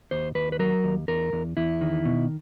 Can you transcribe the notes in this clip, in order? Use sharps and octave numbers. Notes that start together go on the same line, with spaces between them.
D#2 C5
D#2 B4
B4
F#3 A#4
D#2
E2 A#4
E2
E2 E4
D#3
B2